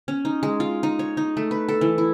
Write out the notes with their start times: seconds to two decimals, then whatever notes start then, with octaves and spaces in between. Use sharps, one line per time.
0.08 C#4
0.25 D#4
0.43 G#3
0.60 F4
0.83 D#4
0.99 C#5
1.17 D#4
1.37 A3
1.51 B4
1.69 A4
1.81 E3
1.98 E4